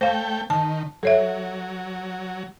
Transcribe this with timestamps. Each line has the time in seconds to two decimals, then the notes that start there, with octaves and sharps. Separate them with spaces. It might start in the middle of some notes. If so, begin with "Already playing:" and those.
0.01 A3 C5 F5 G5
0.50 D#3 A5
1.03 F#3 A4 C#5 E5